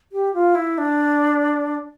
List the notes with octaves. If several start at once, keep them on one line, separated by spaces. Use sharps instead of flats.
G4
F4
E4
D4